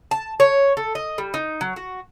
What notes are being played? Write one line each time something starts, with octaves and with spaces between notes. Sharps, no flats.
A5
C#5
A4
D#5
G3
D#4
F#3
F#4